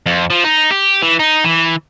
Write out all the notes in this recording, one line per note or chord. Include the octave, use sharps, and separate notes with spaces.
F2
F3
D#4
G4
E3
D#4
E3